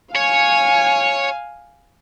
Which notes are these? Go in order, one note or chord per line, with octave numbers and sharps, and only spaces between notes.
C#5 F5 G#5